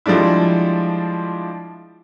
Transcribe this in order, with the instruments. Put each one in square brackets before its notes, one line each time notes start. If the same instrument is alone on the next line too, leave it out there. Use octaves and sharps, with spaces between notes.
[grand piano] F3 G3 G#3 D4 E4